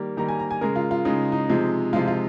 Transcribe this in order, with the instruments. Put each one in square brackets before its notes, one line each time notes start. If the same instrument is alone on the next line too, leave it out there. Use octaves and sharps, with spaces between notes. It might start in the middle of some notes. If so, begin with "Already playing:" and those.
Already playing: [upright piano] D#3 G3 A#3
D#3 G3 A#3 A#5
G#5
A#5
G#5
C#3 G#3 A#4
F4
F4
C#3 G#3 D#4
D#4
C3 F3 G#3
C3 F3 G#3 F4
F4